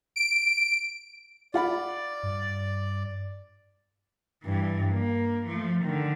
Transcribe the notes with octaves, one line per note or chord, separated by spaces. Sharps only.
D7
F4 D5 F#5 B5
G2
G2 E3
A#3
F3 A3
D3 D#3